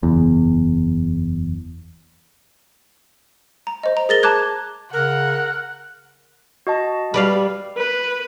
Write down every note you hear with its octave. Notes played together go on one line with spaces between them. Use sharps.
F#1 E2
A#5
C5 D#5
A#5
G#4 A#4 A6 A#6 G7
A5 A#5 D6 F#6 G#6
C#3 A#4 F#5 F#6
F#4 D#5 A5
G3 B4 D5 F5
B4